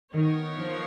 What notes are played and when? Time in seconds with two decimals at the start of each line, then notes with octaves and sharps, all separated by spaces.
0.13 D#3 B3 D#4 A#4 C#5
0.55 F3